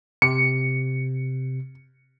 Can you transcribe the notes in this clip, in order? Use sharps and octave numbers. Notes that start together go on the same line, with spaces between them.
C3 C#7